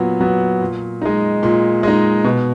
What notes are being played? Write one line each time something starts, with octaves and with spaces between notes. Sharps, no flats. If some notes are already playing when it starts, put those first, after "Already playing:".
Already playing: A#2 F#3 B3
F#3 B3
A#2
G#3 D#4
A#2
G#3 D#4
B2